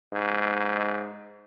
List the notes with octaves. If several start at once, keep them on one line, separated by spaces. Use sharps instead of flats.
G#2